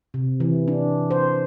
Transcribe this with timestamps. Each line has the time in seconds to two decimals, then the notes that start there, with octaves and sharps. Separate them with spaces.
0.14 C3
0.40 E3
0.68 D4
1.11 C5